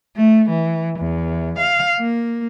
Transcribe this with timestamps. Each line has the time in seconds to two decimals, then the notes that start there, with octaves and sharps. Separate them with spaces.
0.16 A3
0.49 E3
0.99 E2
1.58 F5
1.99 A#3